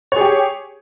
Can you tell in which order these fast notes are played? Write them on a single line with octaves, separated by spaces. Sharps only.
C#5 G#4 G4